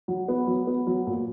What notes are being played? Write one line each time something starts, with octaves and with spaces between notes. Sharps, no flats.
F#3
B3
F#3
B3
F#3
A#2